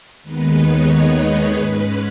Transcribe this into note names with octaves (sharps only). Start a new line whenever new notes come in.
D#2 D#3 G#3 B3 D#4 B4
C#5
D#5
G#4
G#2 G#3 C#4 B4